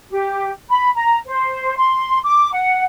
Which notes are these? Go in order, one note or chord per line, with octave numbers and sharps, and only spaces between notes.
G4
B5
A#5
C5
C6
D6
F#5